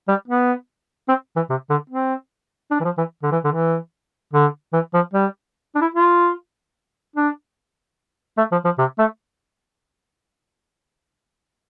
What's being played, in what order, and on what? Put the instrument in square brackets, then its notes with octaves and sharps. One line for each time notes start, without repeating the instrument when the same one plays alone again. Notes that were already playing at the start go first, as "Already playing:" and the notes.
[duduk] G3
B3
C4
E3
C3
D3
C4
D4
E3
F3
E3
D3
E3
D3
E3
D3
E3
F3
G3
D4
E4
F4
D4
A3
F3
F3
C3
A3